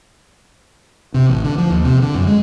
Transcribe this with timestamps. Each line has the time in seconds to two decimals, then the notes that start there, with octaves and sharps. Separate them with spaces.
1.14 C3
1.29 A1
1.44 D3
1.58 F3
1.70 D#2
1.85 C3
2.02 D3
2.14 F#2
2.27 G#3